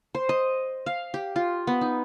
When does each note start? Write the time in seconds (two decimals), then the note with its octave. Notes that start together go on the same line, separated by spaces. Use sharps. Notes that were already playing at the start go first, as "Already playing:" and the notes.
0.15 C5
0.29 D#5
0.86 F5
1.14 G4
1.36 F4
1.67 B3
1.81 D#4